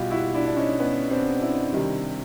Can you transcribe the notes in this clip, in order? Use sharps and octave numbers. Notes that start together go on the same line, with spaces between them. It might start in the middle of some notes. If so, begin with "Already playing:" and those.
Already playing: B2 G3 F4 G4
E4 F#4
D4 E4
D4
C#4 D#4
B3 C#4
C4 D4
D4 E4
C3 D#3 G3